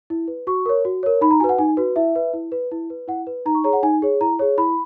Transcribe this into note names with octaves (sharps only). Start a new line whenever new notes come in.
E4
B4
F#4 C#6
A#4 C#5
F#4
A#4 C#5
D#4 B5
A#5
F#4 B4 G#5
F#5
D#4 G#5
F#4 B4
E4 E5
B4
E4
B4
E4
B4
E4 F#5
B4
D#4 A#5
C#6
G#4 C#5 A#5
F#5
D#4 G#5
G#4 C#5
E4 A#5
G#4 C#5
E4 B5